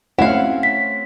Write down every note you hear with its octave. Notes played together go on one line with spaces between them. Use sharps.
A3 C4 C#4 E4 F#4 F5 F#5
B6